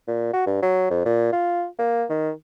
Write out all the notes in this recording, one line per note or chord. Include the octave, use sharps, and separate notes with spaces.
A#2
F#4
G2
F#3
F2
A#2
F4
A#3
D#3